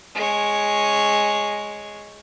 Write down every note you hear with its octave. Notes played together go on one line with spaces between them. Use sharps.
G#3 C#5